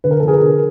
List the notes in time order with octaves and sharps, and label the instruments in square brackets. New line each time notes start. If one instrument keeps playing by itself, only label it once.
[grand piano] D3 B4
A#4
F3 A4
G#4 A#4
D3